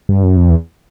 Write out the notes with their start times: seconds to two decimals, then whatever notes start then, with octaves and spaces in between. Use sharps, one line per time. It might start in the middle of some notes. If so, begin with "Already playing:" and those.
0.09 G2
0.23 F#2
0.37 F2
0.50 E2